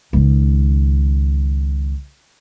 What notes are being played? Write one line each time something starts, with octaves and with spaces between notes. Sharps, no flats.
C#2 D#3